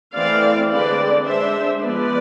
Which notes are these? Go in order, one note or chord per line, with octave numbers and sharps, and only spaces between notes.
E3 A3 C4 D5 F5
D3 G#3 C4 B4 D5
G#3 D4 C5 E5
F3 G#3 B3 B4 D5